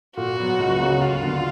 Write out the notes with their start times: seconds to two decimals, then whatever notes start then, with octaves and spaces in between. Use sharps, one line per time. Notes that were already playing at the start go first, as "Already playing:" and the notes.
0.17 A#2 F#4
0.37 F#3 B3
0.58 C#2
0.80 C#3 F#3 A#3
1.00 D2 F4
1.21 D3 F#3 B3